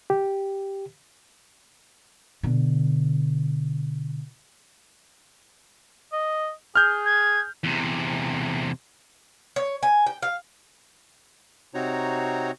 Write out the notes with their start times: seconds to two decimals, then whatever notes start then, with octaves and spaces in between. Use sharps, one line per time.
0.10 G4
2.43 B2 D3
6.12 D#5
6.75 G#4 F6 G6
7.05 G#6
7.64 E2 C3
9.56 C#5
9.83 G#5
10.06 G5
10.23 F5
11.74 C3 C4 D#4 F#4 C#5 A#5